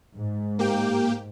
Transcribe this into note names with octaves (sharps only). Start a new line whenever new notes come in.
G#2
A#3 G4 G5